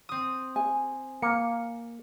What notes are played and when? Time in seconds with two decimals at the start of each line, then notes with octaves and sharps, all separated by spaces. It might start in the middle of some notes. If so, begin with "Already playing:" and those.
0.09 C4 D#6
0.56 G#5
1.22 A#3 C#7